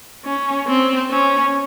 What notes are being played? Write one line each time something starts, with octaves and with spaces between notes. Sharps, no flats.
C#4
C4
C#4